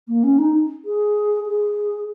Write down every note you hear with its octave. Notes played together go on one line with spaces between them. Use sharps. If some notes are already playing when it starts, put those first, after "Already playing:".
A#3
C#4
D#4
G#4
G#4